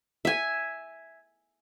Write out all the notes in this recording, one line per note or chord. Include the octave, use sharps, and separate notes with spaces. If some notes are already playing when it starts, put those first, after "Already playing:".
E5 G#5